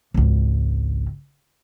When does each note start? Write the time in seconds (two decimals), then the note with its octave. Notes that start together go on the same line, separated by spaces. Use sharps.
0.14 G#1 C#2